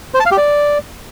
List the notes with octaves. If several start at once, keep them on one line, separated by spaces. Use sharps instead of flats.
C5
A5
F5
G4
D5